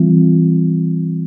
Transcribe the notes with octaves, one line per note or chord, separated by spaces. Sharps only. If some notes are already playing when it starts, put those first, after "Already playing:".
Already playing: E3 G3 C4 F4